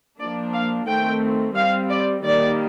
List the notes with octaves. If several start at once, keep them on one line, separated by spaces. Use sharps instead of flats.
F3 A#3 D4 D5
F5
D#3 A3 C4 G5
G3 C4 F5
D5
D#3 G3 A#3 D5